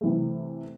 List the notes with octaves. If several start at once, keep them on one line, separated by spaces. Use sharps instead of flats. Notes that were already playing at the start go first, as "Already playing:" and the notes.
C3 E3 A3